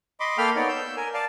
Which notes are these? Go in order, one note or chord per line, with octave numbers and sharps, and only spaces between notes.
D#5 B5 C6 D6
A#3 A4 F5 G5 B5 F6
B3 D#4 C#5 D5
E6 G6
A#4 G#5
D5 F5 A5